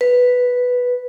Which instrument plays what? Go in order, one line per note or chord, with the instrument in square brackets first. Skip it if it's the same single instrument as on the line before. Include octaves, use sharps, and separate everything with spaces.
[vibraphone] B4